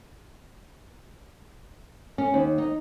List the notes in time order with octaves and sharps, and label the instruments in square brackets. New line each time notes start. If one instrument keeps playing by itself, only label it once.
[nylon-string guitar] C#4
D#2
D#4